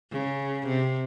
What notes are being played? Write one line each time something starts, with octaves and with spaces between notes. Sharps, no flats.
C#3
C3